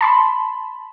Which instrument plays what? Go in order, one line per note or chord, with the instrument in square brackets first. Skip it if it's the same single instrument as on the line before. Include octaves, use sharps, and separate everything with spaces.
[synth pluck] A5 B5 C6